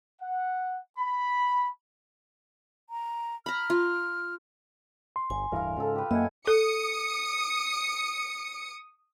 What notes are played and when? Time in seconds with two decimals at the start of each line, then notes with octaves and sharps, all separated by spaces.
0.21 F#5
0.98 B5
2.90 A#5
3.46 A#5 B5 F6
3.70 F4
5.16 C6
5.30 G1 G#5
5.52 D1 G2 E3 A#4 F5
5.77 G#2 C#3 F4 A4
5.95 G4 B4
6.11 F#2 A#3 E4 D#5 F#5 G#5
6.47 A4 D#6 C#7